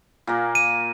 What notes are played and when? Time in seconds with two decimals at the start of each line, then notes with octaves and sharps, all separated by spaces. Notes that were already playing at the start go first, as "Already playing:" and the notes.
0.27 A#2 A#3
0.55 D#7